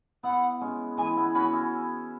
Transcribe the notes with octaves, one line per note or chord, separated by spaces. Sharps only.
B3 E4 F#5
G#3 C#4
E3 G#3 G#5
B3 E4
C#4 F#4 B5
E4 G#4